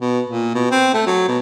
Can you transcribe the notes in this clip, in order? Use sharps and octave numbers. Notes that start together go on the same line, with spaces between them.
B2
A#2
B2
C4
A3
F#3
B2